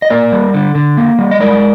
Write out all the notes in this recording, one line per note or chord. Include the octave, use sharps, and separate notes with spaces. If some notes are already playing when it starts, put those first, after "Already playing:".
D#5
A#3 A#4 D5
G3
D3
D3
A#3
G3
D#5
G#3 A#4 D5